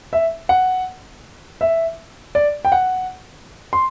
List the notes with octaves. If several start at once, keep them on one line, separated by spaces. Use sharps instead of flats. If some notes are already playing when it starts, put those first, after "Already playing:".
E5
F#5
E5
D5
G5
F#5
C6